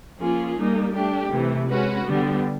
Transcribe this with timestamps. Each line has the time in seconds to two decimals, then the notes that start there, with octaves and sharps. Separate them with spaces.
0.19 F3 A#3 C#4 F4 G#4
0.57 G3 A#3 D#4
0.94 A3 D4 G4
1.30 C3 E3 A3
1.68 G#3 C#4 F#4 B4
2.05 D3 G3 B3